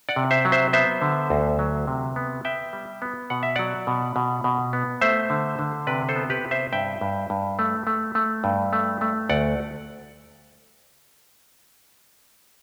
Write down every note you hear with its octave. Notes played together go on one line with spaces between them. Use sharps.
D5 F#5
C3
C5 E5
F#3
C5 E5
B3 C5 E5
D3
D2
F#3
C3
B3
B3 E5 G5
G3
B3
B2 F#5
E5
F#3 D5 F#5
B2
B2
B2
B3
A3 C5 E5
D3
D3
C3 B4 D5
A4 C5
B3
G4 B4
C3
C5 E5
G2 E5 G5
G2
G2
A3
A3
A3
G2
A3
A3
D2 D5 F#5